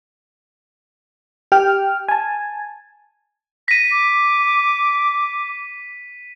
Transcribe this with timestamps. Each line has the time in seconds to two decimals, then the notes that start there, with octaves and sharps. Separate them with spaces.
1.52 G4 G5 F6
2.09 G#5 A5
3.68 A#6 B6 D#7
3.91 D6